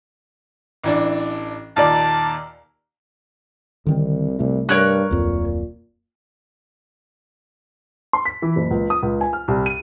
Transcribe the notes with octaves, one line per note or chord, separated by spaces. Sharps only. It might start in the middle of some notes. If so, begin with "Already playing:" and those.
A1 E3 D4
D#2 A#2 D5 A5
C2 D3 D#3 C4
C2 C3 A3
G2 A#4 C#5 F#6
D1 F2 A#2
C6
B6
E3
F#1
C#2
D#6
C#2
G#5
F6
C2
D#7